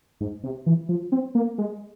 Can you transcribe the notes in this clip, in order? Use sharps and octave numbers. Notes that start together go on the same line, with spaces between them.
G#2
C3
E3
F3
C4
A#3
G#3